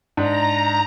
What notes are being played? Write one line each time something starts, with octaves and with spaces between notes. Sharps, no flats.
G#2 D4 A#5